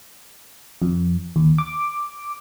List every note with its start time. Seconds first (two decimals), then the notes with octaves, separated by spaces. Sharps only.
0.82 F2
1.36 D#2
1.58 D6